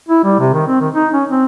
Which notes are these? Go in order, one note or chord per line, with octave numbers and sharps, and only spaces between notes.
E4
G3
C3
D#3
C4
D#3
D#4
C#4
C4